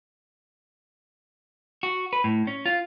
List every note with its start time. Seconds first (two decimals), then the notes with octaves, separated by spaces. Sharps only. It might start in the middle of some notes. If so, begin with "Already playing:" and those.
1.83 F#4
2.13 B4
2.24 A2
2.47 C#4
2.66 F4